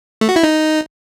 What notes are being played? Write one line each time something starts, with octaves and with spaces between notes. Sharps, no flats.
A3
F#4
E4
D#4